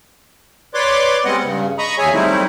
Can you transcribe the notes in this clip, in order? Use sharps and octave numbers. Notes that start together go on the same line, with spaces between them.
B4 C#5 D5 C6 D6
G3 G#3 B3 C4 D#5 F#5
G2 C#3
D#5 A#5 B5 C#6 D#6
D#2 G#4 C#5 E5 G#5
F#3 G3 A3 C4 D#4 E4